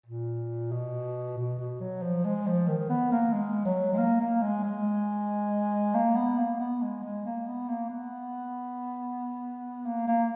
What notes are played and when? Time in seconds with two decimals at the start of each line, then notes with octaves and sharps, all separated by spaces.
0.06 A#2
0.72 B2
1.38 B2
1.59 B2
1.81 F#3
2.02 F3
2.25 G#3
2.47 F3
2.68 D#3
2.89 B3
3.12 A#3
3.33 G#3
3.65 F#3
3.93 G#3
3.98 A#3
4.20 A#3
4.42 G#3
4.64 G#3
5.95 A#3
6.16 B3
6.39 A#3
6.60 B3
6.82 G#3
7.04 G#3
7.25 A#3
7.47 B3
7.69 A#3
7.90 B3
9.86 A#3
10.08 A#3